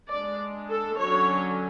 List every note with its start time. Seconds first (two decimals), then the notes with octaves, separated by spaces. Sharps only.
0.11 G#3 D4 D5
0.69 A4
0.99 D3 F#3 C#4 C#5